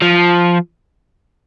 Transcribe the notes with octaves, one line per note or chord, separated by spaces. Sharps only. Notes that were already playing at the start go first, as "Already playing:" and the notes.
F3